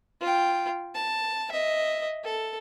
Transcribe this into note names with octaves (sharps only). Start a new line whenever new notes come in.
F4 G5
A5
D#5 E5
A4